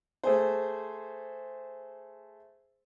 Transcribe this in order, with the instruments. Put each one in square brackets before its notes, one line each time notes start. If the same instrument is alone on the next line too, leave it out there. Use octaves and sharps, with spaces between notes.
[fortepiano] A3 G#4 C5